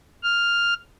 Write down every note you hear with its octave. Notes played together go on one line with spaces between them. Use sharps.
F6